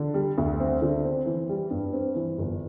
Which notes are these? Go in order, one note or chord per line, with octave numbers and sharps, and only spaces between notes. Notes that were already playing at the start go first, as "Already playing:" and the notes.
Already playing: D3
G3
D2
C4
D3
C4
E3
G3
G2
C4
E3
G1